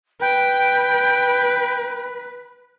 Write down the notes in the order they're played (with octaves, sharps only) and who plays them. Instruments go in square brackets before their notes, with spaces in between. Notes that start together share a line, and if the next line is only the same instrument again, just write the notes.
[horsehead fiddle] B4 [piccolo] G5